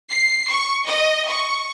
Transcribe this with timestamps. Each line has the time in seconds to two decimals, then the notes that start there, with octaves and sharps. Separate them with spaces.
0.10 C7
0.49 C#6
0.86 D#5
1.26 C#6